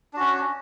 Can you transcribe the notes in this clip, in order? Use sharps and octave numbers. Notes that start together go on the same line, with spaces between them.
C#4 D4 F#4